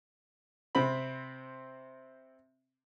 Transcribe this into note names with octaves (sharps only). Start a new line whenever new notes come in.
C3 C4 B5